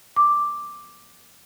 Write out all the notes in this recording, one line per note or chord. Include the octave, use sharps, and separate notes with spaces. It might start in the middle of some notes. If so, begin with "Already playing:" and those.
D6